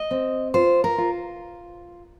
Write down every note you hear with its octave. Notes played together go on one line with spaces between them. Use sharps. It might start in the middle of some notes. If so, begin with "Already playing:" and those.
Already playing: D#5
C4
F4 C5
A#4
F4